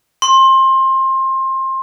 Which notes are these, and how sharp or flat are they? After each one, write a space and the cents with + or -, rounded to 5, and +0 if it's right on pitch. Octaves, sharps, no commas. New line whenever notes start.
C6 +25